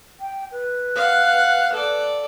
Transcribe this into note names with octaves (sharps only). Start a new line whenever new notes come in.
G5
B4
F5 F#5
A4 D5